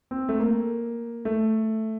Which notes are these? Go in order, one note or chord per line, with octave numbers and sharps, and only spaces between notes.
C4
A3
A#3
A3